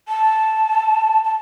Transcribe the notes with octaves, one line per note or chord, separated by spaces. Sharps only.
A5
A5